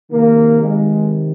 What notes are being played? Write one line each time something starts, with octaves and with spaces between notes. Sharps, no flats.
C3 D#3 A#3
G#3